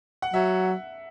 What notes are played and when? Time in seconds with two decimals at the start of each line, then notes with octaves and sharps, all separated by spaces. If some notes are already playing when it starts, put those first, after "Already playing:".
0.22 F#5
0.33 F#3 E5